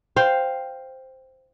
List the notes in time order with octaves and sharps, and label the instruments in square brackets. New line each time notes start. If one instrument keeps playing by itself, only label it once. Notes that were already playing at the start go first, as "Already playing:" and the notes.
[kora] C5 F5 G5